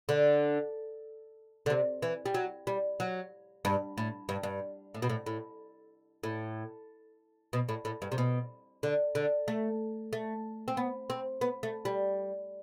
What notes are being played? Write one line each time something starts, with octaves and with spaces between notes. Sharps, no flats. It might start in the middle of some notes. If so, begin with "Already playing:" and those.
D3
D3
C3
E3
G3
F#3
G3
F#3
G2
A2
G2
G2
A2
B2
A2
A2
A2
B2
A2
A2
G2
C3
B2
D3
D3
A3
A3
C4
B3
C4
B3
A3
G3